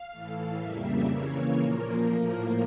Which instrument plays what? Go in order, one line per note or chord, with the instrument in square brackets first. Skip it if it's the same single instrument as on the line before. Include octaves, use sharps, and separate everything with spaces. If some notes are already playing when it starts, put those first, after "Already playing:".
Already playing: [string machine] F5
A2 E3 A3
F2 C#3 G3 A#3 E5
C#3 E3 A#3 C#5
A#2 F3 A#3 A#4
A2 F3 A#3